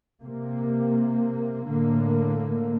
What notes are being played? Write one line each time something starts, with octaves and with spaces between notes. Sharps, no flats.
C3 A#3
A2 D3 A#3